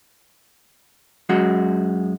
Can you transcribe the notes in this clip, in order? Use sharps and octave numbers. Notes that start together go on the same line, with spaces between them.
F#2 G#3 F#4